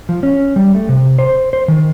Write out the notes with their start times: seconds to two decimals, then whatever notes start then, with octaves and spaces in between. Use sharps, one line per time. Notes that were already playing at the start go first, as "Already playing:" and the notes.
0.09 F3
0.23 C#4
0.56 G3
0.74 A3
0.89 C3
1.18 C5
1.53 C5
1.68 D#3